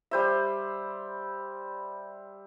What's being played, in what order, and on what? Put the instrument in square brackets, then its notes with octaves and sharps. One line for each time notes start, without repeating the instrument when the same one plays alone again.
[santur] G3 C5 E5